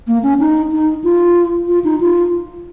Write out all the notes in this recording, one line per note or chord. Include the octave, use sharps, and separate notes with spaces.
A#3
C#4
D#4
D#4
F4
F4
D#4
F4